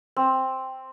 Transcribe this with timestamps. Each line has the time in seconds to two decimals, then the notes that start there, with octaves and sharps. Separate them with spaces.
0.16 C4